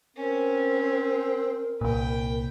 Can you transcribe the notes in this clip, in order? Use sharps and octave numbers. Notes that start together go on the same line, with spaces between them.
C4 C#4 A#4
C2 A#2 B4 G5